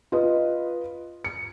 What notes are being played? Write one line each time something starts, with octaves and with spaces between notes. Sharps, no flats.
F4 B4 D#5
C#7